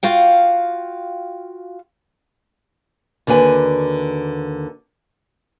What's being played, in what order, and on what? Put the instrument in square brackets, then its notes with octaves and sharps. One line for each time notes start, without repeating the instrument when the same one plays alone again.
[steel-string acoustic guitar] F4 F#4 F5 G5
[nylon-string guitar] D#2 D3 F#4 B4 G#5